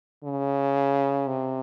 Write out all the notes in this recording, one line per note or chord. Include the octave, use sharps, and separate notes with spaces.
C#3
C3